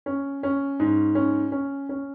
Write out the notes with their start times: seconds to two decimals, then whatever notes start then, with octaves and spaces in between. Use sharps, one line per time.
0.06 C#4
0.43 C#4
0.80 G#2
1.15 C#4
1.52 C#4
1.89 C#4